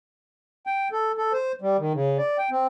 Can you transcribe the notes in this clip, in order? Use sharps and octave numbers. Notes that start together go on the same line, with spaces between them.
G5
A4
A4
C5
G3
D#3
C#3
D5
G5
C4